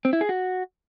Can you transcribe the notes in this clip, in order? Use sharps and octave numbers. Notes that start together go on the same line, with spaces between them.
C4
E4
G#4
F#4